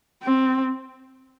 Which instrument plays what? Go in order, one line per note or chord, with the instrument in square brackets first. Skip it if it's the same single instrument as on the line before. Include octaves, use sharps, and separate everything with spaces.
[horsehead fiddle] C4